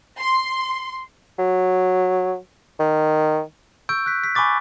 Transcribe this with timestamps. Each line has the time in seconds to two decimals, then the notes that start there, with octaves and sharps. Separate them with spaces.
0.18 C6
1.39 F#3
2.80 D#3
3.89 C#6 E6 G6 D7
4.06 F#6 B6
4.24 B6
4.35 G#5 B5 C#6 D6 A6